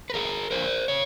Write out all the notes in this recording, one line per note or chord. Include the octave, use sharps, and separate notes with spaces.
B4
E2 C3 E3 G#4 A#4
F2 D3 A#4 C5
C#3 C#5